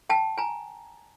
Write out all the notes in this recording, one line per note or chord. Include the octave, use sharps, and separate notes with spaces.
G5 A5
G#5 A#5